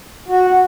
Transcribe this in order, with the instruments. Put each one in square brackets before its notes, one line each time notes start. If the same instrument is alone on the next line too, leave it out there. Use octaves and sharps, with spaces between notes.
[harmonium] F#4